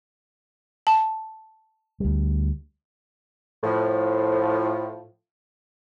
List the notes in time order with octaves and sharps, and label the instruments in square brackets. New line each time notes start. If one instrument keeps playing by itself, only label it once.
[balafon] A5
[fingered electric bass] D2 G3
[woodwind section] A2 F3